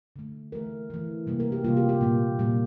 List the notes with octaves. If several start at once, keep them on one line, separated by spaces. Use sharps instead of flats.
D3 A3
E3 A3 A#4
E3 A3
C3 G3 A#3
A#4
G4
C3 G3 A#3 F4
G4
G4
A#2 G3 A#3
A#2 G3 A#3